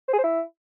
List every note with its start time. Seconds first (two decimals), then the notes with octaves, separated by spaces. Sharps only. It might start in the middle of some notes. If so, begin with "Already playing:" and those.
0.08 C5
0.13 G#4
0.18 C5
0.24 E4